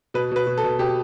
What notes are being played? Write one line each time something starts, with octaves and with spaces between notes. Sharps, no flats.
B2 B4
B2 B4
B2
A4
B2
B2 G4